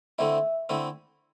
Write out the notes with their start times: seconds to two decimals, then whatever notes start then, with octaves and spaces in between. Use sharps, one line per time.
0.19 D3 A3 C4 E4 E5
0.69 D3 A3 C4 E4